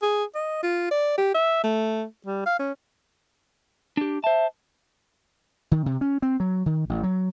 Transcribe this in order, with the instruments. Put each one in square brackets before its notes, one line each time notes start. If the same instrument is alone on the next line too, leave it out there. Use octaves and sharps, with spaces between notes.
[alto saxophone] G#4
D#5
F4
D5
G4
E5
A3
G3
F5
C#4
[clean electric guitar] D4 G4
[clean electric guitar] C5 A5 [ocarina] E5
[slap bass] D#3
C3
C#4
C4
F#3
D#3
A1
F#3